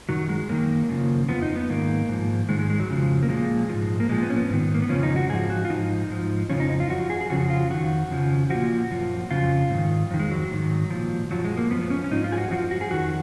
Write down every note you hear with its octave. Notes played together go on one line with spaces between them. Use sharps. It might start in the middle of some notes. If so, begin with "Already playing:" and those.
F#2 D#3 F#3
G#3
F#2 D#3 A#3
F#2 C#3 F3
F2 F3 B3
D#4
B3
G#2 D#3 A#3
G#2 F3
G#2 D#3 G#3
G#3
G#3
F#3
F2 C#3 F3
A#3
A#2 F3 G#3
G#2 F3
A#3
A#2 F3 G#3
B3
C#4
B3
G#2 D#3
A#3
B3
F2 C#3 F3 C#4
D#4
F#4
G#2 F3 G#4
F#4
F4
G#2 F3 D#4
G#2 F3
F2 C#3 F3 C#4
D#4
D#4
F4
F#2 F3 F#4
G#4
G#4
F2 C#3 F3 F#4
F4
F2 D#3 F#4
F2 C#3 F3
A#2 F3 F#4
F#2 F3
F2 C#3 F3 F4
G#2 D#3
F2 D#3
G#3
F#3
G#2 D#3
A#2 F3
F#2 F3 F#3
G#3
A#3
F#2 F3 B3
B3
C#4
C#4
G#2 F3 D#4
F4
G#4
F#4
F#2 F3 F#4
F#4
G#4
F2 D#3 F#4